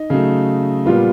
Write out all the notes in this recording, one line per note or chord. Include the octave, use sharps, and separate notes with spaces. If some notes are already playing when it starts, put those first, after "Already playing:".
Already playing: D#4
C#3 F#3 A3
A#2 G3 B3 F4